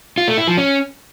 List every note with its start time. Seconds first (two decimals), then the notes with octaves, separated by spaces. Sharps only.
0.18 F4
0.28 A3
0.38 E4
0.48 F3
0.58 C#4